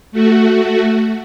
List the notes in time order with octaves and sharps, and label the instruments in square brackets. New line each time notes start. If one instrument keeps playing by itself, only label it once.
[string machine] A3 F#4